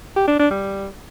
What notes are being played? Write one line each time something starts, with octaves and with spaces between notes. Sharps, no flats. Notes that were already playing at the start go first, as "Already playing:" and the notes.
G4
D4
D4
G3